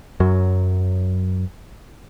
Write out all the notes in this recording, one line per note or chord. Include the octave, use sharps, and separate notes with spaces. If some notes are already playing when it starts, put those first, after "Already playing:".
F#2 F#3